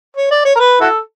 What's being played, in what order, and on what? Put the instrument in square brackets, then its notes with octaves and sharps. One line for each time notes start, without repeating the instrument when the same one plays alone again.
[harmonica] C#5
D5
C#5
A#4
B4
E4 F#4 A4